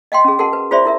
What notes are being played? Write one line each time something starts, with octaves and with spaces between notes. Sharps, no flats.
D#5 F5 G5 C6
C#4 G#4
F#4 G#4 A#4 F#5 A5 C6
B4
F4 G#4 C5 D5 E5 C6
E4 A#4 E5